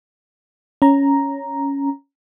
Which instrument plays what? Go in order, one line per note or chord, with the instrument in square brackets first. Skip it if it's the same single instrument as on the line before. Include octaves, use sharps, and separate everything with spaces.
[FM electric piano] C#4 A#5